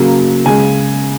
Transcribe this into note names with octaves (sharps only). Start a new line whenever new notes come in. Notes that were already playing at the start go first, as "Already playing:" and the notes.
Already playing: C#3 F#3 A#3
C#3 G#3 G#5